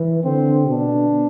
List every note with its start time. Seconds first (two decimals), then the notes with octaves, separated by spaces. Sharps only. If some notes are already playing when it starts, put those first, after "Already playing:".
Already playing: E3
0.24 D3 C4
0.68 B2 D4